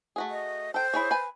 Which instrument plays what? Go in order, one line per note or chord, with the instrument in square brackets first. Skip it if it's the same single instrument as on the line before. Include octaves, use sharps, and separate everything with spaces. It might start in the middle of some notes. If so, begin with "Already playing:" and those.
[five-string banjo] A3 F#4 G#4
[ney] D#5
[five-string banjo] A4 G5 [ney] C5
[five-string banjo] E4 G#4 C#5
B4 G#5